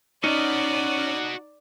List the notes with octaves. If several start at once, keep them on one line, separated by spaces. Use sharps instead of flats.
C#4 D#4 F#4 D5 D#5